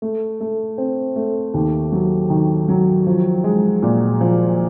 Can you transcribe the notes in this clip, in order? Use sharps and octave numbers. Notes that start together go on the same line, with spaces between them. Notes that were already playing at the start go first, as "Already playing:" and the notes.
A3
A3
C4
A3
D#2
F#3
D#3
F#3
F3
G#3
A#2
F3